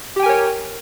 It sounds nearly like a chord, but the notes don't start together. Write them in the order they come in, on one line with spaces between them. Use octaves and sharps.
G4 G5 G#5 A#4 C#5